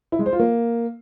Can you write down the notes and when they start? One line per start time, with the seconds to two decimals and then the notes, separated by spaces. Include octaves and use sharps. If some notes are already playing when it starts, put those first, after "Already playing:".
0.12 E4
0.19 G#3
0.26 C5
0.33 F4
0.39 A#3